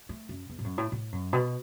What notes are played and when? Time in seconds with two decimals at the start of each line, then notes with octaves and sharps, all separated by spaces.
0.09 A3
0.29 F#2
0.49 E2
0.59 A2
0.64 F#2
0.78 A2
0.92 A2
1.12 F#2
1.33 B2